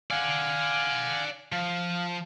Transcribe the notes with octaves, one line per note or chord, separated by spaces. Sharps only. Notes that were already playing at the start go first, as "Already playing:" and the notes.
D5 F5 F#5 G#5 F6
F3 F5